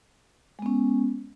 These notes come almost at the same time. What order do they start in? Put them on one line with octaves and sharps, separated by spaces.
G#3 B3 C#4